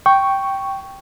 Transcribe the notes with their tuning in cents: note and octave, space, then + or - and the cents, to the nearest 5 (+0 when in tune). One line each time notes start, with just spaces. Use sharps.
G5 -5 C#6 +0